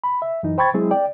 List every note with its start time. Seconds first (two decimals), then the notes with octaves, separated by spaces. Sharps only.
0.04 B5
0.22 E5
0.43 F#2 E3 D#4
0.58 C5 G5 B5 C#6 G#6 A6
0.74 F#3 G#3 C4 E4 G#4
0.91 D5 G5